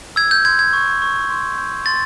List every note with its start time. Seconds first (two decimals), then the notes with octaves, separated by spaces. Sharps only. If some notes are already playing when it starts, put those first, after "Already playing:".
0.16 E6 G#6
0.31 G6
0.45 C6 G#6
0.59 G#6
0.73 C#6
1.02 C#6
1.30 C6
1.58 G6
1.86 C6 A6